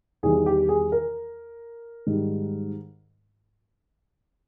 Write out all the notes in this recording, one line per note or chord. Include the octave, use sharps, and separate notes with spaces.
E2 D#3 G3 G#4
G4
G#4
A#4
G#2 D#3 G3